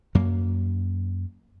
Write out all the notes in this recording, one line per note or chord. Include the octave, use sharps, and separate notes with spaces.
F#2 F#3 A#3